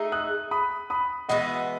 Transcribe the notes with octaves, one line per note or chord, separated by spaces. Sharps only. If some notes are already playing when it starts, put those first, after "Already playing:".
Already playing: A3 D#4 G#4
D#6 F#6
B5 D#6
B5 D#6
E3 G#3 B3 F#4 D#5 F#5